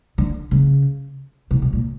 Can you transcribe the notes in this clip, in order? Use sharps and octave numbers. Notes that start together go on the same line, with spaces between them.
D3
C#3
C3
B2
A#2